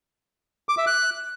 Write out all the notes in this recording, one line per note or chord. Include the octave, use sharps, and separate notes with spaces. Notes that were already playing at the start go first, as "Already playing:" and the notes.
D6
E5
F#6